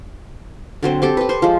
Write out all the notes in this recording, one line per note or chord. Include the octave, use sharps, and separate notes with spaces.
D3 F#3 C4
C4 G4 A4
G4 B4
C5 C#6
F3 G#3